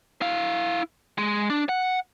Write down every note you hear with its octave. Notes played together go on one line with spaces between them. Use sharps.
E4 F5
G#3
D4
F#5